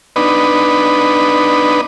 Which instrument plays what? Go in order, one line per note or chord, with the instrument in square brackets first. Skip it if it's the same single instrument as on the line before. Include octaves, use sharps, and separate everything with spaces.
[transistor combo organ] B3 D4 D#4 B4